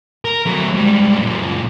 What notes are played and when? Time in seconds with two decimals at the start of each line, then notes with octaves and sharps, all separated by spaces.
0.25 A#4
0.46 F#3 A3
0.74 G#2 G3
1.17 F#2 A#2